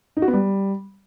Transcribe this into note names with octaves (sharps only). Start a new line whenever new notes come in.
D#4
F#4
B3
G3